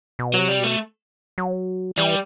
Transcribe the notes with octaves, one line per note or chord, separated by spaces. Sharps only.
B2
C3 F#3
G3
B2 A3
F#3
E3 G3